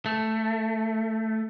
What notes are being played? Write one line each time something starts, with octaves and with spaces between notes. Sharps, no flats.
A3